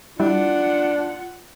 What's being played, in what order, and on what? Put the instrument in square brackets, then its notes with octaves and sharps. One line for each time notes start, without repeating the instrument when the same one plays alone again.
[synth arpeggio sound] G3 E4 [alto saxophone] D4 [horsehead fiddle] F4 F#5